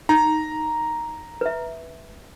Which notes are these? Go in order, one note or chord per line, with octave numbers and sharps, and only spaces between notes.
D#4 A#5
B4 E5